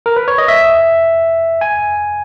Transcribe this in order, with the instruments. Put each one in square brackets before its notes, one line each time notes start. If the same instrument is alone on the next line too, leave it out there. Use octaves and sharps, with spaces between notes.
[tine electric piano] A#4
B4
C#5
D#5
E5
G#5